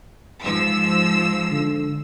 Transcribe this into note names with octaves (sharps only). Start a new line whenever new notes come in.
G#2 F3 E6
D3